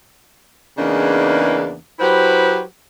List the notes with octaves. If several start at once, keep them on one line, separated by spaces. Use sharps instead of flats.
E2 C#3 E3 A#3 D4 D#4
F#3 E4 G4 B4 C5